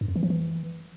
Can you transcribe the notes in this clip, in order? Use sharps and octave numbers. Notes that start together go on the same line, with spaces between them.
G2
F2
E3
F3
E3